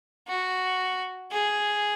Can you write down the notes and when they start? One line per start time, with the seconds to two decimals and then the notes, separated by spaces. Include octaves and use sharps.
0.28 F#4
1.31 G#4